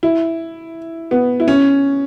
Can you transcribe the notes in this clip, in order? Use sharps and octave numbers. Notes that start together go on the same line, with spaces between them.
E4
B3
E4
C#4